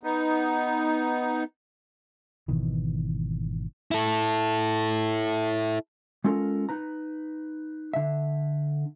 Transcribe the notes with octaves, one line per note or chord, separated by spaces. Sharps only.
B3 D#4
G#1 B2 D#3 E3
E4 A4
G#3 C#4 F4 A4 A#4
D#4 B4 A#5
D3 E5